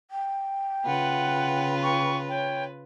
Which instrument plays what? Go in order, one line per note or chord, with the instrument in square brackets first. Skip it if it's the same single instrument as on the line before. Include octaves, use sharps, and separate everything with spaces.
[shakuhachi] G5
[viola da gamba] C#3 F4 B4 [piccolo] F#5
[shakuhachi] G5 [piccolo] C#6
[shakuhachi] C#5 [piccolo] G5